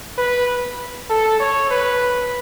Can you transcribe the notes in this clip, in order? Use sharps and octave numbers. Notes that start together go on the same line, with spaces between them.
B4
A4
C#5
B4